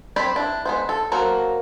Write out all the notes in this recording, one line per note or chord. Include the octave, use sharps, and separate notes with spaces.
C4 G4 C5 D5 B5
D4 E4
G#3 B3 C5
A4
F#3 A#3 F#4 A#4 C5